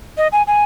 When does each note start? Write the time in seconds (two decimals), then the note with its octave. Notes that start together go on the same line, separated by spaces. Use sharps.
0.17 D#5
0.32 G#5
0.47 G#5